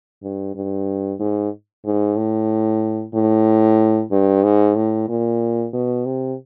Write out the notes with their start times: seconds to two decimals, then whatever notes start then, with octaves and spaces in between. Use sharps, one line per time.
0.23 G2
0.55 G2
1.20 G#2
1.85 G#2
2.17 A2
3.14 A2
4.11 G2
4.44 G#2
4.76 A2
5.09 A#2
5.73 B2
6.06 C3